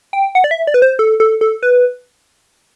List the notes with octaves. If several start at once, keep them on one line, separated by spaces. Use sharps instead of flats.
G5
F#5
D5
E5
D5
B4
C5
A4
A4
A4
B4